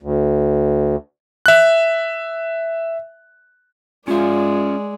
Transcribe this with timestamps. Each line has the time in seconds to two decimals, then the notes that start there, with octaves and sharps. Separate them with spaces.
0.03 D2
1.46 E5 F#6
4.08 G#3 C#4 F4 D5 E5